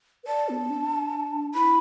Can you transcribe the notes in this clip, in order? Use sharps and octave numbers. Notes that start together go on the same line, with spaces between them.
B4
D5 A5
B3
D4
E4 B5